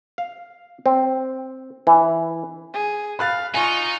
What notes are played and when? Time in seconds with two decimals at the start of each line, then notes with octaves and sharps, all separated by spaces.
0.18 F5
0.86 C4
1.87 E3
2.74 G#4
3.19 F5 B5 F#6 A6
3.54 D#4 F4 G#5 C#6